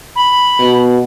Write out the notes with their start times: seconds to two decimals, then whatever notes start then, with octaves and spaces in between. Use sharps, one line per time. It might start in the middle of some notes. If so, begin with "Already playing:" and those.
0.16 B5
0.59 B2